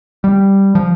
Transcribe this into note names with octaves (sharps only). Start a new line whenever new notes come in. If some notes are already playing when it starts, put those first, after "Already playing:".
G3
F3